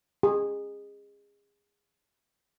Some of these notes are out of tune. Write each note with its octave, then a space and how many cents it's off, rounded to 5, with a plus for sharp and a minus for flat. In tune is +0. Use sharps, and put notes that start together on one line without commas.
G#4 -25